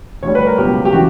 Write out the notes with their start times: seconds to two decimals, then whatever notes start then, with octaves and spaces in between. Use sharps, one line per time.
0.23 D2 D3 G3 C#5
0.35 B4
0.47 A#4
0.58 C#2 B2 F#3 A#3 G4
0.85 G4
0.93 C#3 E3 F#4